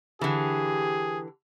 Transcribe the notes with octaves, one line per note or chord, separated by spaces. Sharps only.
D3 E3 G4 G#4